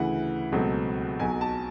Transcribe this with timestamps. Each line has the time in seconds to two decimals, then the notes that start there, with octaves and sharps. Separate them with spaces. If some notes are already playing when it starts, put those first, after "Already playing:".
Already playing: D2 C#3 E3 F#5
0.52 C#2 B2 F#3 A3 C4
1.19 B1 B2 F#3 G#5
1.41 A5